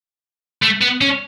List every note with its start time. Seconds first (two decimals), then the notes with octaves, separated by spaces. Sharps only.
0.62 A3
0.81 B3
1.01 C#4